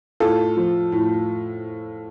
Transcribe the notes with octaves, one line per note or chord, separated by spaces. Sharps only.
A2 F4 A4
F3
A2